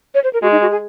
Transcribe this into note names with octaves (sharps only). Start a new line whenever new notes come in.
C#5
C5
A#4
G#3 F#4
D#4
F#4
G#4